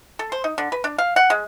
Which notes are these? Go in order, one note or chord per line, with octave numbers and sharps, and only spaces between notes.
A4
C5
D#4
D3
B4
D4
F5
F#5
G#3